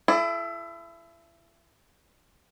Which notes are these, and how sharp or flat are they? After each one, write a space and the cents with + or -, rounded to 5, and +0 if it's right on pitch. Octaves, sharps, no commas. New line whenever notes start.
E4 +30 A4 -25 D5 +20